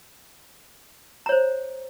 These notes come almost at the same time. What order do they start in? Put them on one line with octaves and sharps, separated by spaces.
A#5 C#5 C5